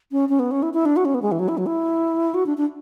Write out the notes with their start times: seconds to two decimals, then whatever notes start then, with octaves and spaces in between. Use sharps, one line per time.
0.12 C#4
0.29 C#4
0.39 B3
0.51 C#4
0.63 E4
0.74 E4
0.86 D4
0.97 F#4
1.05 C#4
1.15 B3
1.22 G#3
1.32 E3
1.39 F#3
1.48 E4
1.58 F#3
1.66 E4
2.34 F#4
2.46 D4
2.57 D4